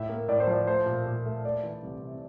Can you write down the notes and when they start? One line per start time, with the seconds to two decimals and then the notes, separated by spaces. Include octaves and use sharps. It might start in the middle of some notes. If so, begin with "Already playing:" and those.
Already playing: A2 E5
0.09 A#3
0.28 A2 D5
0.40 C5
0.47 F3 D5
0.67 A3 C5
0.86 A#2
1.06 A#2
1.25 A3
1.45 A3 D5
1.63 E3
1.83 C2
2.02 C3